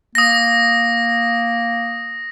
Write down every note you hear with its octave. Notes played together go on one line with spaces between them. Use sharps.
A#3 D#6 A#6